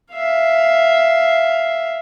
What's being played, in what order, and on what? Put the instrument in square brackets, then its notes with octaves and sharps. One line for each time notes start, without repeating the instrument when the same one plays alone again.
[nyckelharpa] E5 F5